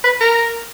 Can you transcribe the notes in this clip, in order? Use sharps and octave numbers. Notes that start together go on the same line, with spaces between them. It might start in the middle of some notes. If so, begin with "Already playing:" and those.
B4
A#4